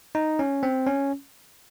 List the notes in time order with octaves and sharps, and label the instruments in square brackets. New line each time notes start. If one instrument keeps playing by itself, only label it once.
[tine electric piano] D#4
C#4
C4
C#4